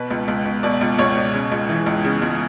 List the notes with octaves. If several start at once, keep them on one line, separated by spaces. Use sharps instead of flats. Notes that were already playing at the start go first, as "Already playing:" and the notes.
Already playing: B2 B4
C#2
C#2
B2
B2 D5
C#2
C#2 C#5
B2
C#3
C#2
E3
C#2
C#3
C#2